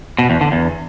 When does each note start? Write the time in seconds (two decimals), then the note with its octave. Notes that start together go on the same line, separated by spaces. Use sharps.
0.19 B2
0.30 E2
0.41 D3
0.52 E2